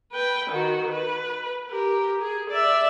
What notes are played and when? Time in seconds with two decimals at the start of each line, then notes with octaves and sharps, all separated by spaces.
0.12 B4 G5
0.50 D#3 F#4
0.92 B4
1.70 G4 A#4
2.21 G#4
2.50 D5 E5